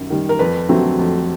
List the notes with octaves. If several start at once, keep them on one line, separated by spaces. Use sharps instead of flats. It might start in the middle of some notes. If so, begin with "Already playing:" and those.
Already playing: F#2 D#3 G3
D#3 G3
A#4
F2 B4
D3 F#3 A3 C4
F2